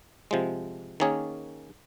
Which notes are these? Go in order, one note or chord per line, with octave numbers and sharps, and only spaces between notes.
C3 F3 G#3
D#3 A#3 C#4 G#4 C#5